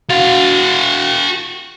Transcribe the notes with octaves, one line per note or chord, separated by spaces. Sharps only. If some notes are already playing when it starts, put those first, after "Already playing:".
F#4 F5